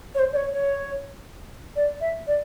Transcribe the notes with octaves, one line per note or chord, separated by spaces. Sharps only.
C#5
C5
D5
C#5
C#5
D5
E5
D5